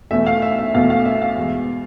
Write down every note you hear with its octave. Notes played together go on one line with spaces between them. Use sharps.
E2 B2 A3 E5
F5
E5
E5
E2 B2 A3 F5
F5
E5
F5
E2 B2 G#3